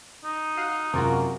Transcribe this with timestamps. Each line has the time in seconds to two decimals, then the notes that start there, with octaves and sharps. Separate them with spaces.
0.24 D#4
0.57 F#4 F5 D#6 F#6
0.93 F#2 C3 G#3 A#3 F4 F#4 A#4